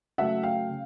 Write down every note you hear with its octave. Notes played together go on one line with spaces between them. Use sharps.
C#3 F#3 A3 E5 F#5
F5 G5
C#3